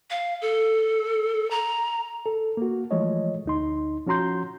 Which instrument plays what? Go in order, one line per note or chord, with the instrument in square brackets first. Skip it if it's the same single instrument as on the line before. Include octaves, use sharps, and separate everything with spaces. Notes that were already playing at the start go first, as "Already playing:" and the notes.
[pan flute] F5
A4
A#5
[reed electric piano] A4
A#3 F#4
E3 F3 G#3 A3 C#5 D#5
D2 D#4 C6
F3 C#4 F#4 A#5 C6 G6